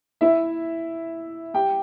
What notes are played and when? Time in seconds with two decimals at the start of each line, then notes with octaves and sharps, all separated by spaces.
0.21 E4 E5
1.54 G4 G5